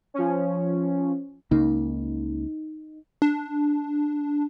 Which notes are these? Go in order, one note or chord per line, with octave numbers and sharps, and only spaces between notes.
F3 C#4
C#2 C#3 A#3 D#4
D4